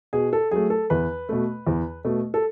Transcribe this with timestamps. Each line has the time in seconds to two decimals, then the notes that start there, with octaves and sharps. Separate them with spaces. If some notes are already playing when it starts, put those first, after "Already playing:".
0.13 B2 G#4
0.33 A4
0.51 F#3 A3 G#4
0.70 A4
0.90 E2 B4
1.29 B2 A3
1.67 E2
2.05 B2 A3
2.34 A4